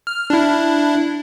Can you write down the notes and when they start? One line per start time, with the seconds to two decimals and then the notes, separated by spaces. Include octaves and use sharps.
0.07 F6
0.30 D4 E4